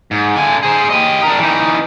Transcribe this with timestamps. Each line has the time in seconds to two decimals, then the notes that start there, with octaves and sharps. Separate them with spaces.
0.11 G#2
0.36 D3 G#5
0.63 G#4 C5
0.90 G4 D#5
1.23 D4 A#4
1.40 E3 D#4